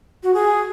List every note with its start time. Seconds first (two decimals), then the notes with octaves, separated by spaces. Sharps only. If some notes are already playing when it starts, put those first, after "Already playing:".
0.23 F#4
0.34 G#4